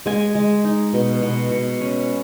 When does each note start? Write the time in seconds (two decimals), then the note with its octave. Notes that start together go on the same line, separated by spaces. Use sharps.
0.06 G#3 G#5
0.35 G#3
0.65 D#4
0.93 B2
1.22 B2
1.51 B2
1.81 C#4